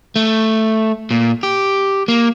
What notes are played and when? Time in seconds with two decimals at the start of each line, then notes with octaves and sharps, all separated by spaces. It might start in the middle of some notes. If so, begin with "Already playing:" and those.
0.16 A3
1.11 A#2
1.43 G4
2.08 A#3